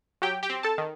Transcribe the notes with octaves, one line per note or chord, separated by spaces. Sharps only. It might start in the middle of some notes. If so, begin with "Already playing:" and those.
F#3 G4 G5
G4 G5
C4
A4 A5
D#3